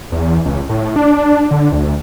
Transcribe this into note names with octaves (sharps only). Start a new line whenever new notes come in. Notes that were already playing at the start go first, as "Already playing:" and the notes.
E2
C#2
A2
D4
D3
D2